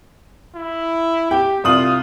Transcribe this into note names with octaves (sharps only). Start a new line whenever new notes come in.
E4
G4 G5
C2 F4 D#6 F#7